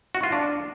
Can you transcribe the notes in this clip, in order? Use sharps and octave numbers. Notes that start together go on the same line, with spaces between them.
F#4
F4
D4